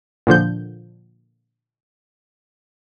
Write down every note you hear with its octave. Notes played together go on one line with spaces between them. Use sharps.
A#2 D3 F3 G6